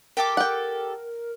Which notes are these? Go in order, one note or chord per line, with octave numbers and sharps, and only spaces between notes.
G4 A4 A#4 D6
F#5 G5